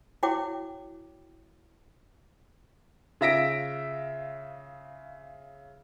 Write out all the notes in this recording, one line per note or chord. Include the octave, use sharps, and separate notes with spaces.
E4 F#4 C#5 G5 D6
C#3 F4 E5 A#6 B6 D7